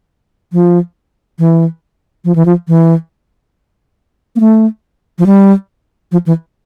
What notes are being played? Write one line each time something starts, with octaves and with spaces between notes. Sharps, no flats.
F3
E3
F3
E3
F3
E3
A#3
A3
F3
G3
F3
E3